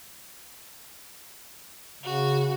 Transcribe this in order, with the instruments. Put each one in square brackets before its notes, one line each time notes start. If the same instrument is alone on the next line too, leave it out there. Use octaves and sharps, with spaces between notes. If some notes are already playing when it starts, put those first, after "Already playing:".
[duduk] C#3 [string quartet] F#4